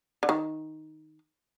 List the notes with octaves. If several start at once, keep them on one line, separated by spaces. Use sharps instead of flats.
D3
D#3